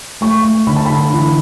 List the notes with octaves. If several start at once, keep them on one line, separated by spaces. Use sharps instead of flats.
A3 C#6
A3
D3 B5
A5
D3 B5
E3